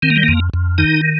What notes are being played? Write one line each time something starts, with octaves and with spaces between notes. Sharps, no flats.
D#3 C4
A#3
G3
F2 A#3
F2
D#3 D#4